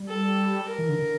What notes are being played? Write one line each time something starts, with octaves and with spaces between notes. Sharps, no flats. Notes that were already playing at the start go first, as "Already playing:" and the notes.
Already playing: G3
A4
A#4
E3
D3
D3